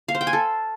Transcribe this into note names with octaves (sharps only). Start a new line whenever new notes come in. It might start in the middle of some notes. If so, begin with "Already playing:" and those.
F5
C5
G5
G#5
A4